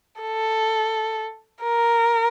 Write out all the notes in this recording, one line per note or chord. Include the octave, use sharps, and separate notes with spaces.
A4
A#4